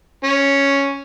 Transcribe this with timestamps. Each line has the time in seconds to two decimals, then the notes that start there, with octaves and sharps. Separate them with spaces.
0.24 C#4